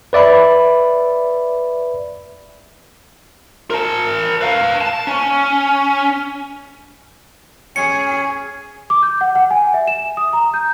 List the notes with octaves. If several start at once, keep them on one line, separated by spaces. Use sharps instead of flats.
B4 D5 E5 B5
A#4 A5
B4 F5
A5
C#4
C#4 G#4 C#5 G#5 C#7
D6
G6
F#5
F#5
G#5
E5
E7
D#6
A#5
G6